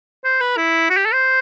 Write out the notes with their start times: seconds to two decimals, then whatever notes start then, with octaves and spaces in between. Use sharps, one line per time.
0.24 C5
0.41 B4
0.57 E4
0.90 F#4
0.97 G4
1.05 A4
1.13 C5